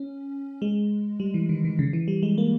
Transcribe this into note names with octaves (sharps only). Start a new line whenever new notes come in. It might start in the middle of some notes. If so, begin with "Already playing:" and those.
Already playing: C#4
G#3
G3
E3
D#3
D#3
C#3
E3
G3
G#3
A#3